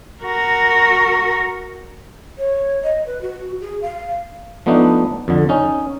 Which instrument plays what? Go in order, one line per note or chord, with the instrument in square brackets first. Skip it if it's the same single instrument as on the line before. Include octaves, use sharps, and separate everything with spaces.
[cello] F#4 A#4
[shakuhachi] C#5
D#5
B4
F#4
G#4
F5
[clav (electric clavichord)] F3 A3 B3 D4 D#4
F2 D3
C#4 D#4